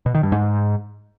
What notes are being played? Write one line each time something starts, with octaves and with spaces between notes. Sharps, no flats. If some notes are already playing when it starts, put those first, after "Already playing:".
B2
D#3
G2
G#2